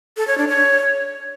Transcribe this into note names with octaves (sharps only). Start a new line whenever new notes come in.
A4
C#5
D4
C#5